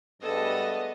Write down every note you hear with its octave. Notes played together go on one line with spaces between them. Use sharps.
G2 G#3 A3 B3 A4 D#5